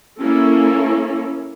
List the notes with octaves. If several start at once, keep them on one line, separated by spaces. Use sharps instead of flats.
A#3 C#4 E4 A4